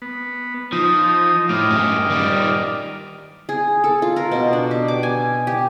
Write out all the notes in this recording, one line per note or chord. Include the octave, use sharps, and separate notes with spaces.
B3
F3 D#4 D#6
A2 D#5 D6 F6
G2 C#4
D#3 G3
G#4
A4
F4
A#4
B2
D4
G4
D6
G#5
G4